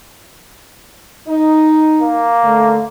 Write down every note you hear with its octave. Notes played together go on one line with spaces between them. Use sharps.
D#4
A#3
D3 A3